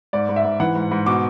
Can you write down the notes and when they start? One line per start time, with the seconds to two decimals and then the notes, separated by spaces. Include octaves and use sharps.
0.13 G#2 D5
0.29 G#2
0.36 E5
0.45 G#2
0.60 E3 F#5
0.75 G#2
0.91 G#2
1.06 B2 D6